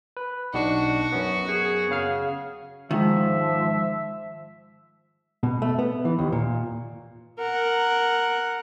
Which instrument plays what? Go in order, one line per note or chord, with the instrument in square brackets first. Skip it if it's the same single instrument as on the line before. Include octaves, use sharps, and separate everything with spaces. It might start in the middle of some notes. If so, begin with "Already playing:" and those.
[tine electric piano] B4
[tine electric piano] B1 D4 [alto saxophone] D#4 [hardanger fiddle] F#4
[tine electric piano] F#2 B3 [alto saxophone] C#4
[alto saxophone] G#4
[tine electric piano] C#3 F5 F6
[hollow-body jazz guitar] G#2 D#3 [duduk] F3 [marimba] G#3 F4 [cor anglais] E5
[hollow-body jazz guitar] B2
A3
B3
E3
D#2
A#2
[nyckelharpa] A#4 F#5